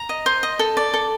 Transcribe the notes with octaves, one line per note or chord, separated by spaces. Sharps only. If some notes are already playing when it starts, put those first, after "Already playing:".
Already playing: A#5
D#5
C5
D#5
A4
D5
A4